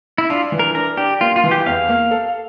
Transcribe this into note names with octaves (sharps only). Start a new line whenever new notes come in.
E4
D4 F4
E3
A#4
D4 A#4
D4 G4
A#3 F4
F4
E3
G4
E2 F5
A#3
A4